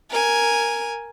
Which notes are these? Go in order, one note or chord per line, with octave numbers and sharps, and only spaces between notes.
A#4 G#5